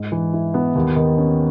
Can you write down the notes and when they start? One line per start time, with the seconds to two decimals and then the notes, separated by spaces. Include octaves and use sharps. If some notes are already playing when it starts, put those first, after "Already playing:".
Already playing: G#2
0.12 E3
0.33 E4
0.54 B3
0.75 D#2
0.96 D#3
1.18 C#4